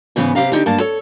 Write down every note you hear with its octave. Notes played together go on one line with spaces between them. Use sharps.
G#2 C#3 E3 B3
C3 G4 B4 F5 A#5
D3 D#4 G4
G2 A#3 A5
A4 C#5